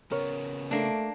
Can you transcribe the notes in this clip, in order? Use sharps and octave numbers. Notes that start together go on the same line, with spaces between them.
C#3 B3 A#4 C#5
A3 A#3 D4